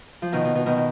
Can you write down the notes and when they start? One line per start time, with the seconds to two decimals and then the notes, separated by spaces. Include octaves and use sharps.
0.22 F3
0.32 B2 D#3
0.44 B2
0.55 B2
0.66 B2 D#3
0.76 D#3